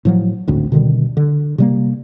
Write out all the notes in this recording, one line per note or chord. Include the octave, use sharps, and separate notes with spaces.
A2 F3 F#3
G#1 D2 A2
B2 D3 D#3 G3
D3
C3 G3 A#3